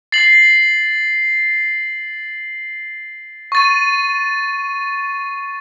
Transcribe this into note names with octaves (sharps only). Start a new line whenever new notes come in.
A6 C7 F#7
C#6 A6 D#7